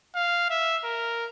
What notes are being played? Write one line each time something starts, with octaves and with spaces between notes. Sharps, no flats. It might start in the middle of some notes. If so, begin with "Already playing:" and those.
F5
E5
A#4